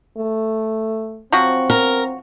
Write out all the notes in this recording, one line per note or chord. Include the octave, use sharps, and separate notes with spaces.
A3
F3 F#3 C4 F#4
A#4